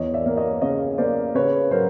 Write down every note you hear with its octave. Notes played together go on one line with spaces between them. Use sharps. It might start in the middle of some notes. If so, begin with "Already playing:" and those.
Already playing: E2 C#5 D#5
D5 E5
A#3
C#5 D#5
C#3 C#5 D#5
A#3 C5 D5
C#3 B4 C#5
F#3 A#4 C5